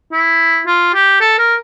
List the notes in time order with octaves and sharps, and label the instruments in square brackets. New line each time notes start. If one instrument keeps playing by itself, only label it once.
[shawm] E4
F4
G4
A4
A#4